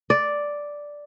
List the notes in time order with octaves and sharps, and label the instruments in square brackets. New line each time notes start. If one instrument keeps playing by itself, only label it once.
[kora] D5